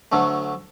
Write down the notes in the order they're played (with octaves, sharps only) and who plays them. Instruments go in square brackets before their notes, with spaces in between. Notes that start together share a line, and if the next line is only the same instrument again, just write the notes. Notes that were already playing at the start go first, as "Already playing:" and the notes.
[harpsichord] D2 D3 F#3 A3